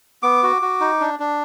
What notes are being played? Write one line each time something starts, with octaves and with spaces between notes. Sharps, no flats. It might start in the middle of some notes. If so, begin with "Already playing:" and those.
B3 D6
F#4
F#4
D#4
D4
D4